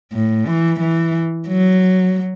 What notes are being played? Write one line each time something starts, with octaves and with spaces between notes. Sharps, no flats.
A2
E3
E3
F#3